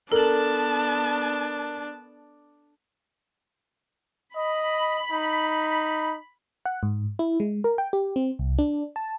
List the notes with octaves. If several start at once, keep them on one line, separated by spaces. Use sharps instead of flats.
B3 D4 A4 A#4 A5 F#7
D#5 B5
D#4
F#5
G#2
E4
G#3
A#4
G5
G4
C4
C2
D4
A5